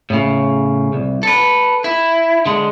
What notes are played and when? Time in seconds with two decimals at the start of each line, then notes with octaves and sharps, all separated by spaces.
0.10 A2 C#3
0.93 C2
1.23 A4 B4
1.84 E4
2.46 D3 G#3